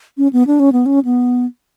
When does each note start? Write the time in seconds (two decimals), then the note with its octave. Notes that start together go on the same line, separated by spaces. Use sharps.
0.18 C#4
0.33 B3
0.47 D4
0.60 C#4
0.72 B3
0.86 C#4
1.05 B3